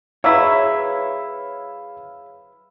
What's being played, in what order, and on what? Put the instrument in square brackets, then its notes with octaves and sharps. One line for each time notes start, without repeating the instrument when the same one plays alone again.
[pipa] F#3 E4 [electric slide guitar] G#4 B4 C#5 [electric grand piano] F5 E6 B6